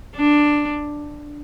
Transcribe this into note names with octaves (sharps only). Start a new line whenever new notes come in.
D4